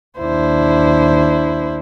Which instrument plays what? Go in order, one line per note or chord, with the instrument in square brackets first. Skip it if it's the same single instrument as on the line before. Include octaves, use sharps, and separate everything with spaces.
[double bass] D#2 D4 [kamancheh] E4 C5